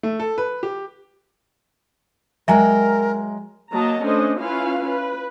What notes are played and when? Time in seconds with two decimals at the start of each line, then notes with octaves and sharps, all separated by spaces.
0.03 A3
0.19 A4
0.38 B4
0.63 G4
2.48 F#3 G#3 A#4 E5 G5 G#5 A#5
3.72 F#3 A#3 D#5 A5 A#5
4.04 A3 C#4 D4 C5 D#5
4.40 C#4 E4 F4 B4 F5
4.89 B4